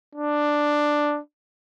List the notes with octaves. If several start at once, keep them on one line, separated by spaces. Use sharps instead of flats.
D4